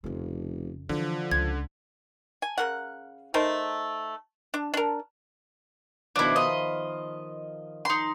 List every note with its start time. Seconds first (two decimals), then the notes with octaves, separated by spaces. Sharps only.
0.04 F1 F2 C#3
0.89 D3 E3 F3
1.31 C#2 G#6
2.42 G#5
2.58 C#3 A#4 F#5
3.34 A3 D#4 A#4 C5
4.54 D4
4.74 D4 A#4
6.16 B2 D#3 F3 D4 E4
6.36 D#5 F5 B5 C6
7.85 D#4 C6